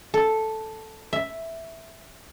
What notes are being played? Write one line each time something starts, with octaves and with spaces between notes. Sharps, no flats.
A4
E5